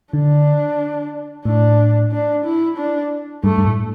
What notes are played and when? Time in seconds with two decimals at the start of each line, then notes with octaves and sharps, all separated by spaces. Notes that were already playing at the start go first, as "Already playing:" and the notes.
0.13 D3 D4
1.45 A2 D4
2.12 D4
2.45 E4
2.78 D4
3.44 G2 A3
3.58 G2
3.66 A2